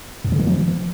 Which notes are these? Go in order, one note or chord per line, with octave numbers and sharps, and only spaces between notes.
F2
C#3
D#3
F3